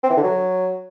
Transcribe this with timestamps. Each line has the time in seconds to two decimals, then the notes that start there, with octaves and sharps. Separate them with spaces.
0.03 C4
0.10 E3
0.17 D3
0.23 F#3